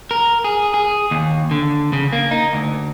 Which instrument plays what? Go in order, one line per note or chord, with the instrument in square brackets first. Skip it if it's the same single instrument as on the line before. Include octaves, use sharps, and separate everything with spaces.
[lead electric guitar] A#4
G#4
G#4
D#2
D3
C#3
A#3
D#4
D2